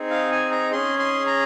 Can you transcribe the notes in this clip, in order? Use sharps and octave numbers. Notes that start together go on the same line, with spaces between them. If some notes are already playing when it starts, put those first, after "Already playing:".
Already playing: C4 D#4 G#4
F5
G#5
A#5
C#4 G#4 C6
C6
A#5